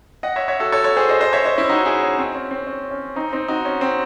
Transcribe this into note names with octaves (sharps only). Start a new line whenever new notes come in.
D#5 F#5
C#5 E5
C#5 E5
F#4 A4
A4 C#5
A4 C#5
G#4 C5
C5 D#5
C5 D#5
C#5 E5
C5 D#5
C#4 E4
D#4 F#4
E4 G#4
C#4
C4
C#4
C4
C#4
C#4
C4 D#4
C4 D#4
D#4 F#4
C#4
C4